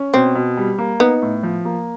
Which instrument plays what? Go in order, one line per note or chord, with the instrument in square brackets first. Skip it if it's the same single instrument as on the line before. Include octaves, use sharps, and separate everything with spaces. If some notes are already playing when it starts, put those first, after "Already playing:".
Already playing: [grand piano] C#4
[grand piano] B2 [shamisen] C4
[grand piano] B2
G3
A#3
[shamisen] B3 [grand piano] D#4
[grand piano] A2
F3
A#3